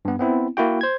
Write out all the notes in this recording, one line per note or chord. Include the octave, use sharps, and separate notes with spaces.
G2 B3
B3 C4 E4
A#3 E4 F#4 G5
C5 G#6